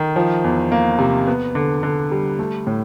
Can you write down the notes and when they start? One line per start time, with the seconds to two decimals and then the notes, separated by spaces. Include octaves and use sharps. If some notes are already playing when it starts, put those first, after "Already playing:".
Already playing: D#3
0.16 F3
0.44 E2
0.72 A#3
0.99 C3
1.27 B3
1.55 D3
1.83 D3
2.12 G3
2.39 A3
2.67 A2